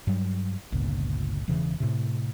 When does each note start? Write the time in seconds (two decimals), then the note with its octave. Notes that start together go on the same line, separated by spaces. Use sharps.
0.07 G2 F#3 G3
0.72 G1 C#2 A#2
1.48 E1 E2 C#3 E3
1.80 A2 C3